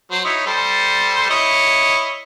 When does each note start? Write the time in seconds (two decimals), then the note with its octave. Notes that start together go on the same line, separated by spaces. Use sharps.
0.11 F#3 C5
0.25 D#4 E4 C#5
0.46 G3 A4 C5
1.30 E4 C#5 D#5